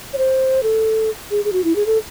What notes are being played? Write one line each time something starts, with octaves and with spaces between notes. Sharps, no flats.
C#5
C5
A4
G#4
G#4
F#4
E4
G#4
A4